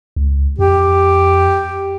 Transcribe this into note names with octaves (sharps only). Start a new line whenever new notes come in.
C#2
F2 G4